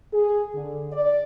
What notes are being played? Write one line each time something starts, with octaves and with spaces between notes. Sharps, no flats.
G#4
D3
D5